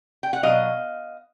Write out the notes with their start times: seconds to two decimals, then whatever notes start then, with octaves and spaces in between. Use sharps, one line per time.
0.23 G5
0.33 F#5
0.43 B2 F#3 D#5 F5